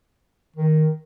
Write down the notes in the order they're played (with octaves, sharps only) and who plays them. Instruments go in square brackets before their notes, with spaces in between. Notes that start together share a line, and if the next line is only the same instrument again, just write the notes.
[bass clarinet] D#3